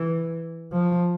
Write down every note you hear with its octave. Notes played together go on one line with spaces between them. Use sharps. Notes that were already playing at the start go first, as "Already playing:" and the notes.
Already playing: E3
F3